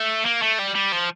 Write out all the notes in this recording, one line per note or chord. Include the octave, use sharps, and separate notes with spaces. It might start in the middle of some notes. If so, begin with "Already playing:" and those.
Already playing: A3
A#3
A3
G3
G3
F3